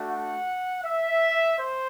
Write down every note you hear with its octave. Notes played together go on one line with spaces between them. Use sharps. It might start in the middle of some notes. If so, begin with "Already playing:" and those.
Already playing: A3 D4 F#4
F#5
E5
C5